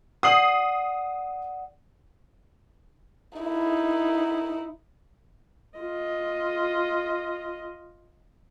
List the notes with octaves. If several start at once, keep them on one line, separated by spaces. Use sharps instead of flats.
D5 F#5 D#6 C7 F#7
D#4 E4
F4 D#5